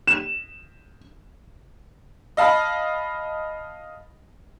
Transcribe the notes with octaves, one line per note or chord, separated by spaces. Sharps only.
E7
D#5 F5 A5 B5